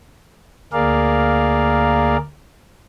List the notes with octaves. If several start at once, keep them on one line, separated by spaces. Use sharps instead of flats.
D2 A#3 G#4 A#4 D5 F5